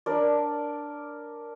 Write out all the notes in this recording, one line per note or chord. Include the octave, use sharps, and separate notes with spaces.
D4 A#4 D5